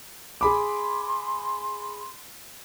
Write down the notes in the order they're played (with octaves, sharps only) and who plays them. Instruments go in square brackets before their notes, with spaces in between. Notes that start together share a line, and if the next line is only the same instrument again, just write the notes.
[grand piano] G#4 B5 D6 [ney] C6